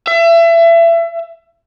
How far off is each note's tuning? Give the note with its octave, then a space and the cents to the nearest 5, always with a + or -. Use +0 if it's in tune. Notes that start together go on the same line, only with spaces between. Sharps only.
E5 +30